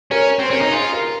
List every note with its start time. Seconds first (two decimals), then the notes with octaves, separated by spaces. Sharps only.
0.11 C#4 A#4 C#5
0.39 C4 C5
0.50 C#4 A#4
0.61 D#4
0.72 F4 G#4
0.93 A#4